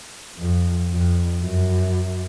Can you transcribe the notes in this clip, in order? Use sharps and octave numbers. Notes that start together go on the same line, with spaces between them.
F2
F2
F#2